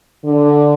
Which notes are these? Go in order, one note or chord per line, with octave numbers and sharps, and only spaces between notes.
D3